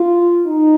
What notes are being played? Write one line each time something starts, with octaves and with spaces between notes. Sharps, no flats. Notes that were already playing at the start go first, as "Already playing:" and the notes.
Already playing: F4
D#4